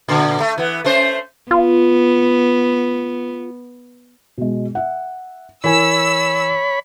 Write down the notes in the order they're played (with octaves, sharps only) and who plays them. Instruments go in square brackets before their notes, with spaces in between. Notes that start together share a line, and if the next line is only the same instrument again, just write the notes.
[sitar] A#2 D3
A3
E3 B3
A3 C#4 C5
[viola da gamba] B3 [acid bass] F4
[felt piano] B2 G#3
E5 F#5
[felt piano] E3 A#4 G#5 [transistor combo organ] C#5 B5 [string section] E6